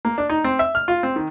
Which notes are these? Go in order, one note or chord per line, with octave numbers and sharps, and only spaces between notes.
A#3
D4
D#4
C4
E5
F6
F4
C4
D#3